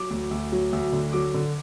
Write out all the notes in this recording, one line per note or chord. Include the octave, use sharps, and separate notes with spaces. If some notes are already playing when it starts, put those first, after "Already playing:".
Already playing: F#3 D6
D2
D2
F#3
D2
D3
F#3 D6
D3